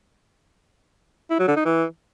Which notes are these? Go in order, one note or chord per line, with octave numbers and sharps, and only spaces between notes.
E4
F#3
D3
D#4
E3